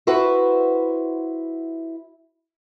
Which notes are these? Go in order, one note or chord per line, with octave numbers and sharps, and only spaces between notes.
E4 F#4 B4 C5 E5